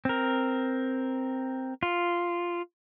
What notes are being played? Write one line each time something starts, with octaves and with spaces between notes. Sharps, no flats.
C4 A#4
F4